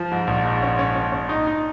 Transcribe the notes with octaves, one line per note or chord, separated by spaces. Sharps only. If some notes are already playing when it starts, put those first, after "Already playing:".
Already playing: F3
G#2
A#1
G#2
C#4
C#4
C#4
C#4
D#4
D#4